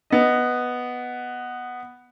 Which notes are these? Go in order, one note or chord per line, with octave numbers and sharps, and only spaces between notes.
B3 D#5